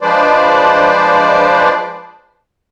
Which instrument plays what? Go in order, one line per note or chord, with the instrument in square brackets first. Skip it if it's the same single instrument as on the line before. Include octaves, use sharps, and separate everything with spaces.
[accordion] F3 G#3 D4 B4 C5 D5